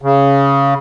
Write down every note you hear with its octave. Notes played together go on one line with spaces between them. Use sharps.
C#3